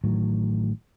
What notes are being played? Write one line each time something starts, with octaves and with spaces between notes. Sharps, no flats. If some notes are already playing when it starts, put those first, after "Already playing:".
A1 A2 D#3 F#3